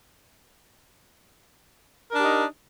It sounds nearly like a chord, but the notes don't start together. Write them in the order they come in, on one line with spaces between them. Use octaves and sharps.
A#4 D4 G4 D#4